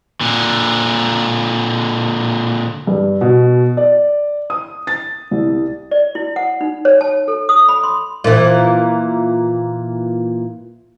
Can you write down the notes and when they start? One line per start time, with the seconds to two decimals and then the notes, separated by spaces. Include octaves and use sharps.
0.21 A#2 D3
2.87 G2
3.21 B2
3.77 D5
4.50 D#6
4.87 A6
5.31 C2
5.91 D5
6.15 E4
6.36 F#5
6.61 D#4
6.85 C#5
7.01 A5
7.28 A4
7.49 D#6
7.68 B5
7.83 C6
8.24 A#2 E3